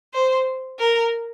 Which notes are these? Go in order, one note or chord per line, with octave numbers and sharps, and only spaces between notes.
C5
A#4